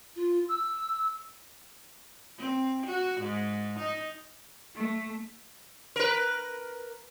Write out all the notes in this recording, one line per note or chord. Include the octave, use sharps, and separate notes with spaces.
F4
E6
C4
F#4
G#2
D#4
A3
A#4 B4